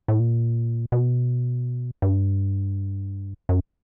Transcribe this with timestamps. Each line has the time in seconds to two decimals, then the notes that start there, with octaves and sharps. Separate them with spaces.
0.08 A2
0.20 A#2
0.92 B2
2.02 G2
3.49 F#2